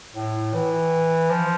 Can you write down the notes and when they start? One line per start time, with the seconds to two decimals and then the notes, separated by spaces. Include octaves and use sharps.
0.15 A2
0.53 E3
1.30 F3